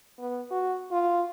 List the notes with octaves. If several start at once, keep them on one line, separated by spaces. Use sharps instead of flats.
B3
F#4
F4